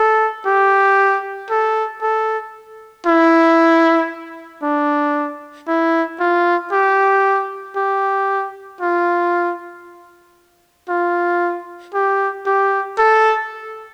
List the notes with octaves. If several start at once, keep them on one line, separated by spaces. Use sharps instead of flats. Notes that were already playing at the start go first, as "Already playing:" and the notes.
Already playing: A4
G4
A4
A4
E4
D4
E4
F4
G4
G4
F4
F4
G4
G4
A4